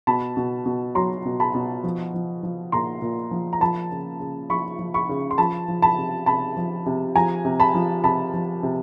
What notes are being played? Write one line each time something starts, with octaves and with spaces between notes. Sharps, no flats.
B2 A5 B5
B2
B2
F#3 A#5 C6
B2
A5 B5
B2
F3
F3
F3
A#2 A#5 C6
A#2
F3
A#5
F3 A5 B5
C#3
C#3
F3 B5 C#6
F3
B5 C#6
C#3
C6
F3 A5 B5
F3
A5 B5
C3
C3 A5 B5
F3
C3
F3 G#5 A#5
C3
A5 B5
F3
C3 A5 B5
F3
C3